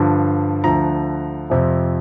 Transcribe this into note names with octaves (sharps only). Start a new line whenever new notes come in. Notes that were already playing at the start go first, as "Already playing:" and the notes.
Already playing: G2 D3 F3
D2 D3 F3 A#5
F2 C3 F3